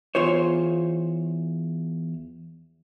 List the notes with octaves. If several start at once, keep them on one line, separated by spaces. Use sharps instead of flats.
E2 F4 C5 C#5